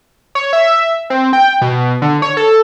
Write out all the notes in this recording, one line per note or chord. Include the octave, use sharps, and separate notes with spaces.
C#5
E5
C4
G5
B2
D3
C#5
A4